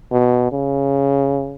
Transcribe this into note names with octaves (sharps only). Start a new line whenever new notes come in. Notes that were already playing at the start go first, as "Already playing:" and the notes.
B2
C#3